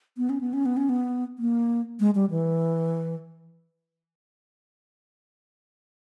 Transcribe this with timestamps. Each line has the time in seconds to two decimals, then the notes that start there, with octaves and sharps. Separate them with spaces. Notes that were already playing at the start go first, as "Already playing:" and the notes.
0.17 B3
0.30 C#4
0.41 B3
0.53 C#4
0.66 B3
0.77 C#4
0.89 B3
1.39 A#3
2.00 G#3
2.15 G3
2.30 E3